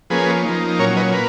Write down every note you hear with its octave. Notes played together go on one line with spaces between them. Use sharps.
F3 A#3 C#4 G#4 B4
F3 A#3 D#4
A#2 F#3 C#4 A#4 C#5
B4 D#5
A#3 B4